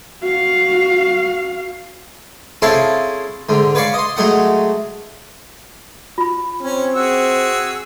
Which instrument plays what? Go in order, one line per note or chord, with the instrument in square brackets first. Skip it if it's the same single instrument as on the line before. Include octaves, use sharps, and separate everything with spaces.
[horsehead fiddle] F#4 F5
[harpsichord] C4 C#4 E4 G#4 A4 F5
G#2 D3
B4 C#5 D5 F5 B5 C#6
D#5 C6
F#3 G#3 A3 D#4 F#5
[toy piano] F4 B5
[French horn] C4 [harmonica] C#4
[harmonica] F#4 G#4 E6